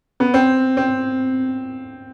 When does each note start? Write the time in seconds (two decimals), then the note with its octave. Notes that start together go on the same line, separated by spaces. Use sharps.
0.20 B3
0.34 C4
0.77 C4